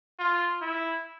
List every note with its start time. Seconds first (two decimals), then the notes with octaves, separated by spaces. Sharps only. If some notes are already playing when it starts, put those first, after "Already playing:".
0.19 F4
0.61 E4